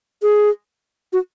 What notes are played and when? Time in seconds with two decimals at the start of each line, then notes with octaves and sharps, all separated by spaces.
0.23 G#4
1.13 F#4